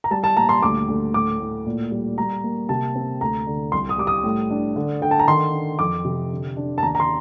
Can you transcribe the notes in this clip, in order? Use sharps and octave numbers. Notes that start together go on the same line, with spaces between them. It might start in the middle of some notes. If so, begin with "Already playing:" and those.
A#5
G3 A5
A5
A#2 A#5
C6
D2 D6
D2
A2 D6
A2
A#2
G3
G3 A#5
A#3
C3 A5
C4
D2 A#5
D3
C2 C6
D#6
G3 D6
D#6
A2
D4
D3
D3 G5
A5
A#5
D#3 C6
D4
F2 D6
C3
D3
D4
A5
D#2 A#5
A#5
C6